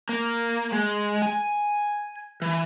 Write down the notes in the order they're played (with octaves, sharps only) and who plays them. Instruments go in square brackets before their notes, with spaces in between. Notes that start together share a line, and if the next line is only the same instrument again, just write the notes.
[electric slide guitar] A#3
G#3
G#5
E3